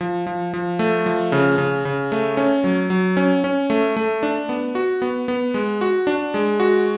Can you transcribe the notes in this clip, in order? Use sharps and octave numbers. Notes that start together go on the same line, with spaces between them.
F3
F3
F3
A3
F3
C#3
C#3
C#3
A3
C#4
F#3
F#3
C#4
C#4
A3
A3
D4
B3
F#4
B3
B3
G#3
F#4
D4
G#3
F#4